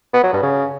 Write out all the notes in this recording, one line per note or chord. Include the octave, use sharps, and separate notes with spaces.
B3
F#3
G2
C#3